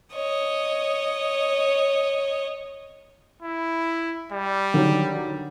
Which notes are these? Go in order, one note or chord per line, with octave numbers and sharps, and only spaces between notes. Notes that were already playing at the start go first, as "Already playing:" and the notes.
C#5 D#5
E4
G3
D3 D#3 F#3